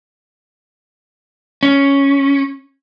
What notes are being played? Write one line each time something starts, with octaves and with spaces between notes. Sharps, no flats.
C#4